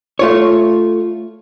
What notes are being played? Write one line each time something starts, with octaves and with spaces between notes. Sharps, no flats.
A3 F4 C#5